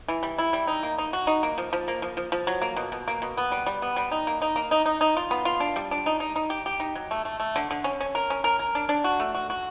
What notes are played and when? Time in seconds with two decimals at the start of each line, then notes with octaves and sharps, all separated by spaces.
0.08 E3
0.23 G3
0.38 E4
0.53 G3
0.67 D#4
0.83 A#3
0.98 D#4
1.13 F#4
1.27 D#4
1.43 A#3
1.58 F3
1.73 F3
1.88 A#3
2.02 F3
2.17 F3
2.32 F3
2.47 F#3
2.62 A#3
2.76 B2
2.92 B2
3.08 A#3
3.22 B2
3.37 B3
3.52 G3
3.66 G3
3.82 B3
3.96 G3
4.12 D#4
4.27 A#3
4.42 D#4
4.56 A#3
4.71 D#4
4.86 D#4
5.01 D#4
5.17 F4
5.31 B3
5.45 F4
5.60 D4
5.76 G3
5.91 D4
6.06 D#4
6.20 D#4
6.36 D#4
6.50 G4
6.66 G4
6.80 D#4
6.95 F#3
7.11 A3
7.25 A3
7.40 A3
7.56 D3
7.71 D3
7.84 C#4
8.00 C#4
8.15 A#4
8.30 C#4
8.44 A#4
8.59 A#4
8.75 D4
8.89 D4
9.04 F#4
9.20 A3
9.35 F#4
9.50 F#4